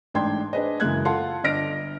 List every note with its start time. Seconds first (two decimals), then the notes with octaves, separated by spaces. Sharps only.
0.14 A1 G#2 D4 G5 C6 G#6
0.53 D4 G#4 B4 C5 D#5
0.80 F#2 C#3 E3 G#3 F#6 G#6
1.05 F4 A4 F#5 A5 C6
1.44 G1 D4 D#5 F6 A#6 D7